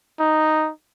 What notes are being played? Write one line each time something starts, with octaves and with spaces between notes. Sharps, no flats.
D#4